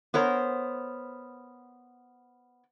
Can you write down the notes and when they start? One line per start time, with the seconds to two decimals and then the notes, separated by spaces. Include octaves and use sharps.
0.14 B3 A#4 C5 C#5